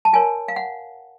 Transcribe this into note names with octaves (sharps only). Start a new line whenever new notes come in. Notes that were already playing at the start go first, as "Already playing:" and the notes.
A5
F4 A#4 C#5 G#5
F5
F#5